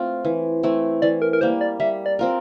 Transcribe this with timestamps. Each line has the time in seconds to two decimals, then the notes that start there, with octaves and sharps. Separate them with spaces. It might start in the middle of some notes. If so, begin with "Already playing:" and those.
Already playing: A3 C4 F4
0.25 E3
0.63 A3 C4 E4
1.02 E3 D5
1.22 A#4
1.33 A#4
1.41 G3 A#3 C5
1.61 D5
1.80 G3 E5
2.06 D5
2.19 C4 F4 A#4